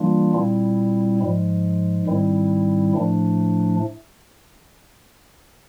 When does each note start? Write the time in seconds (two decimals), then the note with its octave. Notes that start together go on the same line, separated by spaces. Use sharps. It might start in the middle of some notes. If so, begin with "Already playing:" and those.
Already playing: E3 G3 A#3 D4 F4
0.34 A#2 G3 C4 E4
1.20 G#2 F3 G#3
2.06 G#2 D#3 G3 C4 E4
2.93 A2 F3 A3 D4